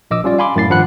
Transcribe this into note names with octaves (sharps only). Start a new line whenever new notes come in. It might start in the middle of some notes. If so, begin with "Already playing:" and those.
A#1 D#5 D6 E6
G3 C#4 F4 D5
F5 G#5 B5 C6 D6
F#2 A2 A6 C7
G#1 G2 F3 F#5 B5 F#6